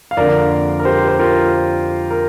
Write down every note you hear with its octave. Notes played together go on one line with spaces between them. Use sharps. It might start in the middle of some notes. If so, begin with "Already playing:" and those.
F5
F2 D3 A#3 D4 A#4 D5
A#4
G4 C5
C5
F4 A#4
A#4